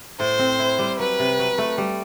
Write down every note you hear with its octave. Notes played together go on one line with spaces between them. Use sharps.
A2 C5
C4
E4
G3
F#3 B4
C3
F#3
A3
G3